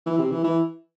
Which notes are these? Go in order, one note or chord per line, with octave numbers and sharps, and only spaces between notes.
E3
C3
E3
E3